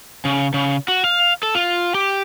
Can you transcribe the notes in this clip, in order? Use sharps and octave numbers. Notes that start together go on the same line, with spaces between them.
C#3
C#3
F#4
F5
A4
F4
G4